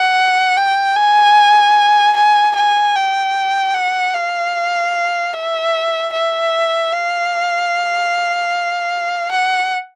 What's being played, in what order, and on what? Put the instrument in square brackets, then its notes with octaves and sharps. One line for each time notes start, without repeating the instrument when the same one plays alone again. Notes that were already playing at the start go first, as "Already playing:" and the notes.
Already playing: [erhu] F#5
G5
G#5
G#5
G#5
G5
F#5
F5
E5
E5
F5
F#5